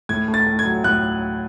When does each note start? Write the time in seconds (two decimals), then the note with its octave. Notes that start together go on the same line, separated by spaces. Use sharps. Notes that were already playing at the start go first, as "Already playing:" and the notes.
0.09 A2 G#6
0.28 A3
0.34 A6
0.47 A2
0.59 G#6
0.65 F#3
0.84 A2 F#6